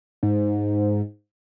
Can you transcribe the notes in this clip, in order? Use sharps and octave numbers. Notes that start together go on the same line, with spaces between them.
G#2